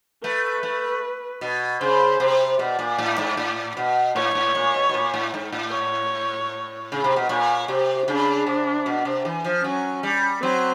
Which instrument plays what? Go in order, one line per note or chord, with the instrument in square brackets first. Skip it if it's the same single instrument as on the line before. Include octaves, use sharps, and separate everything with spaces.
[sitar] A3 [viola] B4
[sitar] A3
B2
[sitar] C#3 [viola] C5
[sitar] C3
[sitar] B2 [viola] D5
[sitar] A#2
A2
G#2
A2
B2
[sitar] A2 [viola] C#5
[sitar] A2
A#2
B2
B2
A#2
A2
G#2
A2
[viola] C#5
[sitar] C#3
C3
B2
[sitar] A#2 [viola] C#5
[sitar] C3 [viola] G4
[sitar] C#3 [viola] D4
[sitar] C3
B2
C3
E3
F3
[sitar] F#3 [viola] C#4
[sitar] G3
[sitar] F#3 [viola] C4